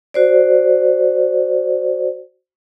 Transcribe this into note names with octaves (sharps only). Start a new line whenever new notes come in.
F#4 C5 D5